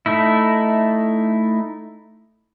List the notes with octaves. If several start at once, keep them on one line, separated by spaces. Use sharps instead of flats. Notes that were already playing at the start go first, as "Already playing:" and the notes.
A3 D#4 E4